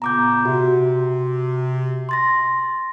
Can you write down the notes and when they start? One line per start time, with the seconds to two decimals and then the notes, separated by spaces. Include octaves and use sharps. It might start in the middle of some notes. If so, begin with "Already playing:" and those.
0.02 A#2 C#3 B3 A#5 D6 G6
0.45 C3 F#4
2.09 C6 A6 A#6